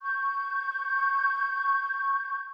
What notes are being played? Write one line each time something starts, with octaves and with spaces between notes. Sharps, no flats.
C#6 G6